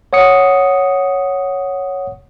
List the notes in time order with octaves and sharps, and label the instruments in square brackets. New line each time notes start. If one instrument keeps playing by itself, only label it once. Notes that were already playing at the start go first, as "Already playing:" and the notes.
[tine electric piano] C#5 F#5 D#6 C#7